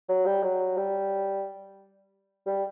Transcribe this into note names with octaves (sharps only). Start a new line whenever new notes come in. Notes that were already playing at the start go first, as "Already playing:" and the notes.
F#3
G3
F#3
G3
G3